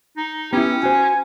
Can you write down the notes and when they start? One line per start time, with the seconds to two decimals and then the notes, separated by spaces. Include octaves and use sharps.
0.17 D#4
0.53 B3 C#4 E4 G4
0.83 F#4 C5 G#5